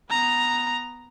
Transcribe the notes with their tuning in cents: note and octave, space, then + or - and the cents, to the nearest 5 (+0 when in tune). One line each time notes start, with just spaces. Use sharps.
B3 +10 A#5 +0